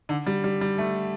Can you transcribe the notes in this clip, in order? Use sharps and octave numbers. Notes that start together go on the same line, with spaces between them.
D3
G3
G3
G3
A3